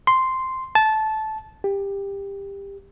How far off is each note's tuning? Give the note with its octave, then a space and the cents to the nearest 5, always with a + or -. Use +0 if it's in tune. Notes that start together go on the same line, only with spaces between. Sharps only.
C6 -5
A5 -15
G4 +20